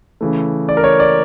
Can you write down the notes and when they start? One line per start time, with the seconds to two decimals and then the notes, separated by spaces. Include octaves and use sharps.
0.21 C#3 E3 A3
0.69 D5
0.77 A#4
0.84 C#5
1.00 D5